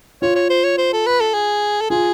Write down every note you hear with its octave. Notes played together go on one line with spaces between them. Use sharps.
F4 C#5
C#5
C5
C#5
C5
A4
B4
A4
G#4
A4
F4 G#4